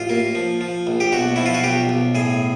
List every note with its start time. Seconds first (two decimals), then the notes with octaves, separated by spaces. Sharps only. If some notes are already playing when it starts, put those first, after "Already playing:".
Already playing: A1 F4
0.09 A#3
0.35 F3
0.61 F3
0.87 A#1
1.00 G4
1.12 B1 F#4
1.36 F3 E4
1.46 F4
1.54 F#4
1.64 B1 G4
1.89 B1
2.15 A2 G#4